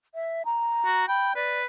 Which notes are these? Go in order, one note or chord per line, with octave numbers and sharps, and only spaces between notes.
E5
A#5
F#4
G5 B5
B4 D5